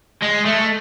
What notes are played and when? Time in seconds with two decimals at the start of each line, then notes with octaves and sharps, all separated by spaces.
0.22 G#3
0.45 A3